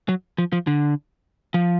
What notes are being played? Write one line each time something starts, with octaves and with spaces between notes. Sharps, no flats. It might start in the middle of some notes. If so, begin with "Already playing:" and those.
F#3
F3
F3
D3
F3